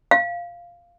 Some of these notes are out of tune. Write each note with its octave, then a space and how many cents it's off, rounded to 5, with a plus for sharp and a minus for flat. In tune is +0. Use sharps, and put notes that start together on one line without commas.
F5 -5